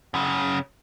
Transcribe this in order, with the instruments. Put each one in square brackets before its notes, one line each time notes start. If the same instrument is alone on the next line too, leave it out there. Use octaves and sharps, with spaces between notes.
[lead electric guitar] F#2 C#3